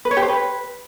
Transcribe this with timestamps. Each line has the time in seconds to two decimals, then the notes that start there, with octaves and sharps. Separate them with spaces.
0.05 B4
0.11 C#5
0.17 G4
0.22 C5
0.28 B4